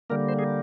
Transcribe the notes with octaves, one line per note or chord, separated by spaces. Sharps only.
D3 G3 A#3 A#4
C5
G#4